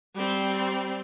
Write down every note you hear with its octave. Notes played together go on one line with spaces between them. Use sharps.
G3 C4